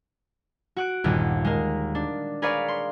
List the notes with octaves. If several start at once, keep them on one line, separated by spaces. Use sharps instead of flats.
F#4 F#6 D7
G1 D#2 A#2
G#3 A#4
D4
G#4 A#4 B4 C#5 D5 F5
C6